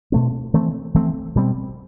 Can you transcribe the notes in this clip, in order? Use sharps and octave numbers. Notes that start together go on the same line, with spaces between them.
B2 A3 C4
E3 A3 C4
E3 A3 C4
B2 G3 C4